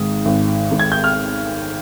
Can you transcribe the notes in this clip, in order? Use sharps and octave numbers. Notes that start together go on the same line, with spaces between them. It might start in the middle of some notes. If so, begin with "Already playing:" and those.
Already playing: G#1 G#2 D#3 D#6
G#1
G#2 D#3
G#6
G6
F6